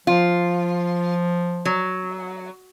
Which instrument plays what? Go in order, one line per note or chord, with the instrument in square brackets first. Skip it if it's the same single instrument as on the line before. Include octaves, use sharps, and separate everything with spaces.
[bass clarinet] F3 [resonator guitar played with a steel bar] F4
[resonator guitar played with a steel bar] F#3